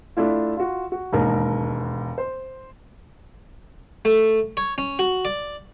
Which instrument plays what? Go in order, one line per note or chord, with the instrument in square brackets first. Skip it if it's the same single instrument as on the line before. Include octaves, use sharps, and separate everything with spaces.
[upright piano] A3 D4 E4 F4
F4 F#4
F#4
E1 D#2 G#2 D#4 A#4
C5
[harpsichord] A3
C#5
C#4
F#4
D5